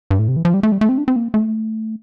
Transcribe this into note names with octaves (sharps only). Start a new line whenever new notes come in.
G2
A2
C3
E3
F3
G3
A3
G3
A3
C4
D4
C4
A#3
A3